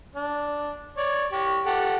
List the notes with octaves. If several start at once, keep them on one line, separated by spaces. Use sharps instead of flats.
D4
C#5 D5
G4 C#6
G4 A4 F#5